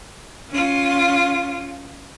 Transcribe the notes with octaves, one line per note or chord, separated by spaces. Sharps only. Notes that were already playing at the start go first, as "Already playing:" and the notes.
C#4 F4